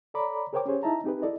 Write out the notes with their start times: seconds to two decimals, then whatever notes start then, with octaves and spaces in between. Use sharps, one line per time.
0.14 A4 C#5 D5 A#5 B5 D6
0.53 G#4 A#4 C5 C#5 G5 D6
0.66 C#4 G4 G#4 C5 C#5
0.83 D#4 E4 D#5 E5 A5 A#5
1.04 C4 D#4 G4 G#4 B4
1.22 E4 A4 D5 D#5